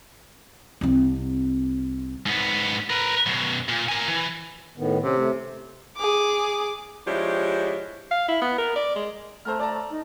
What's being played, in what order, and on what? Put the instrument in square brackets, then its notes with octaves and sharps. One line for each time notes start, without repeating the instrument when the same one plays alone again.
[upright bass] C2 C4
[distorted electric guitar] G#2 B3
A#4 B4
F#2 B2
A#2
A#4 G#5
E3
[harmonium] A2 D#3 B3
[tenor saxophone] C3 [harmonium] C#4
[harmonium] A3
[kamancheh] G#4 D6
[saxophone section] F3 G#3 D4 E4 G4 C#5
[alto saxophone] F5
E4
B3
A#4
D5
G#3
[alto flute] A3 [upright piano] C5 A#5 F6
[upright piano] D5 A5 A#5
[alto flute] D#4